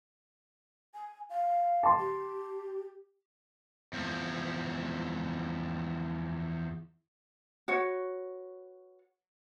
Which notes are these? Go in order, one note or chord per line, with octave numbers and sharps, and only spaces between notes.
G#5
F5
A5 C6
G4
E2 F3
F#4 B4 C#5